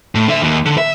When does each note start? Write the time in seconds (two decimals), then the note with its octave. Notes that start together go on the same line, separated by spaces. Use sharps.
0.15 A2
0.28 D3 E5
0.43 D#2
0.66 D3
0.78 E5